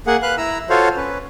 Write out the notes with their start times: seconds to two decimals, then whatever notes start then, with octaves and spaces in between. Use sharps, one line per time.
0.07 A#3 G#4 F#5
0.22 B4 F5 F#6
0.37 E4 A#5 E6
0.70 F4 F#4 A4 C5 C#5 F5
0.97 C#4 B4